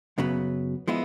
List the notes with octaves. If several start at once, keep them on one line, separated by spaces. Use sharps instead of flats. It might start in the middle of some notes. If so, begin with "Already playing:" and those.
F#2 C#3 F#3 B3
F3 G#3 B3 E4